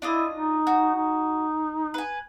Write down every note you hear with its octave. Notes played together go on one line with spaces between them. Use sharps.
D4 E4 F4 D#5
D#4
F#4
D#4
B4 G#5